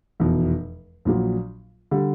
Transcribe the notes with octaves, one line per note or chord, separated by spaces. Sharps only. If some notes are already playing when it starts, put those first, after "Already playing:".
F1 E2 B2
A#1 A#2 F#3
D3 G3